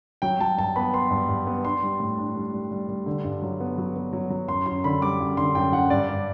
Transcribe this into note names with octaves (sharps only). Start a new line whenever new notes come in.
F#3 G5
F#3 A5
G2 A5
B3 B5
B3 C6
G2
G2
B3
D4 C6
G3
A2
D4
G3
G3
G3
G3
D3
G2
F#3
B3
F#3
B3
F#3
F#3
F#2 C6
F#2 C6
D3 B5
G3 D6
F#2
D3 C6
F#2 G5
F#2 F#5
G2 D5
G2